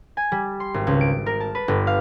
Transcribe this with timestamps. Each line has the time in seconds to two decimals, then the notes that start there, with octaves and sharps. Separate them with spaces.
0.17 G#5
0.32 G3
0.60 C6
0.74 G#1
0.87 C#2
1.01 D7
1.26 A#4
1.40 A5
1.55 B4
1.68 G1
1.87 F5